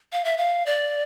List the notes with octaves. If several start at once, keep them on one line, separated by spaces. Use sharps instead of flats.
F5
E5
F5
D5